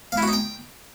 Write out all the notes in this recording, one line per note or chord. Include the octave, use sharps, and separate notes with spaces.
F5
E4
F#4
D#4
G5